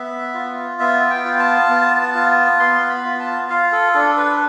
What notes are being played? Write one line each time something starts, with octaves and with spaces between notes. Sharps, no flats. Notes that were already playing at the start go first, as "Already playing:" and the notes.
Already playing: B3 E5
F4
B3 E5
G5
F4
A5
B3
F4
B3 C6
B5
F4
A5
F4 F5
A4
D4 A4
B4